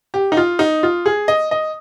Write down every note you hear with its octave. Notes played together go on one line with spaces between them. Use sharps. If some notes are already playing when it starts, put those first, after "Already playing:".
G4
D#4
F4
D#4
F4
G#4
D#5
D#5